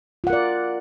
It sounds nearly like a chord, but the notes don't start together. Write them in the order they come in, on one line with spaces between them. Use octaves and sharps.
F4 F#5 A#4 D5